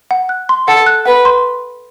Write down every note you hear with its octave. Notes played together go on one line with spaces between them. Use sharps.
F#5
F#6
C6
A4 F#5
F#6
B4 F#5
C6